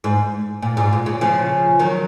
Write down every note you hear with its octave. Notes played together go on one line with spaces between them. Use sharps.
G#2
A#2
G#2
A#2
C#3
C#3 F3
D#3 F#3